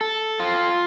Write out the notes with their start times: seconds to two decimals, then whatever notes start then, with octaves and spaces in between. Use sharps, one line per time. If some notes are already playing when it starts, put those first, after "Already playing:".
0.01 A4
0.40 F4